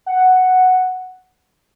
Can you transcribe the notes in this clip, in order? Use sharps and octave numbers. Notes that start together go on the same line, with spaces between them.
F#5